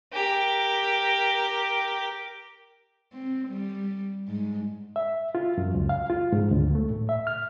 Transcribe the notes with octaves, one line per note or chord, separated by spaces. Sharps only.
G4 A#4
C4
G3
G#2
E5
F4
F#2
C#2
F5
F4
G#2
D2
A3
A2
E5
F6